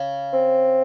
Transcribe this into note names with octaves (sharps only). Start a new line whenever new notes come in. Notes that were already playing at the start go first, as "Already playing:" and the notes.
Already playing: C#3
C4